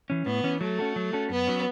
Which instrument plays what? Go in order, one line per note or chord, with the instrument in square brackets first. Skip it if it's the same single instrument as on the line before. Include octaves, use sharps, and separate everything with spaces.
[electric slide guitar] E3 C#4
[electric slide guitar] A2 [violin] B3
[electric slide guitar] E3 C#4
[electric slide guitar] F#3 [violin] A3
[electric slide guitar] C#4 F#4 A4
F#3
C#4 F#4 A4
[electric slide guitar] F#2 [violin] B3
[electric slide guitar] F#3 C#4